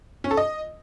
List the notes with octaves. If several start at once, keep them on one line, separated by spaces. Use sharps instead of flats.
C#4
A4
D#5